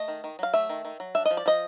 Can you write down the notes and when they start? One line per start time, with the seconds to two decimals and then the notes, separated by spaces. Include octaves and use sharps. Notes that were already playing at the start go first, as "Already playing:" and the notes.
Already playing: A3 D#5
0.08 D#3
0.24 D#3
0.39 F#3 F5
0.54 A3 E5
0.69 D#3
0.85 D#3
1.00 F#3
1.15 D4 E5
1.25 D#5
1.31 F3
1.37 D5
1.46 F3 D#5